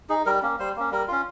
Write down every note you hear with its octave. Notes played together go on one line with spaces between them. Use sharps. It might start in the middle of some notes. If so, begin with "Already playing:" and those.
D#4 G#4
G3 A#4
A#3 C#4
G3 C5
A#3 C#4
G3 A#4
C#4 F4